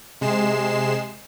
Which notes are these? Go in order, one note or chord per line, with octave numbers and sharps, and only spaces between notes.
C3 G#3 C7 E7